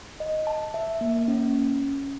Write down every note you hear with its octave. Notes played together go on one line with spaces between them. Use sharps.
D#5
A5
E5
A#3
C#4